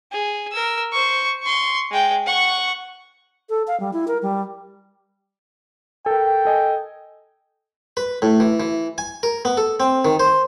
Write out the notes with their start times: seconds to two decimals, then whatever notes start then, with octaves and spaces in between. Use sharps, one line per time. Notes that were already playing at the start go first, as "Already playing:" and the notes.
0.12 G#4
0.52 A#4 E6
0.93 C5 C#6
1.43 C6 C#6
1.91 G#3 G5
2.26 F#5 C#6
3.49 A4
3.67 F5
3.80 G3
3.93 E4
4.08 A#4
4.22 G3
6.06 A4 A#4 G5
6.45 A4 D#5 G#5
7.97 B4
8.22 A2
8.40 E3
8.60 E3
8.98 G#5
9.23 A#4
9.45 B3
9.57 A4
9.80 C4
10.05 D#3
10.20 C5